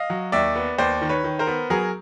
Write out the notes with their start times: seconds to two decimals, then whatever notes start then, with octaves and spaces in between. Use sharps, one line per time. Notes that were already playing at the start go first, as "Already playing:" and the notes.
Already playing: D#5 F5
0.10 F#3
0.32 D#2 D5 E5
0.56 B3
0.78 D#2 C5 D5
1.01 D#3
1.09 B4 C#5
1.24 D#3
1.39 A#4 C5
1.47 B3
1.70 F#3 G#4 A#4